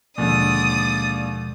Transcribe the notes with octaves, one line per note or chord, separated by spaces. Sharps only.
D#2 B2 D3 F3 G#3 D5 D#6